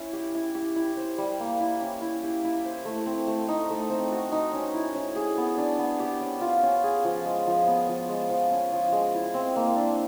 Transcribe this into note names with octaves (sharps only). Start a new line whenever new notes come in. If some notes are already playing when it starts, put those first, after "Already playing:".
Already playing: C#4 E4
G4
E4
G4
E4
C5
G3
A#3
E4
C#4
E4
G4
E4
C5
A3
C4
A3
D#4
A3
C4
F#4
D#4
C#4
E4
C#4
G#4
B3
D4
B3
G4
C#4
F4
C#4
G#4
F3
G#3
F3
B3
F3
G#3
F3
C#4
F3
G#3
E4
C4
A#3
D4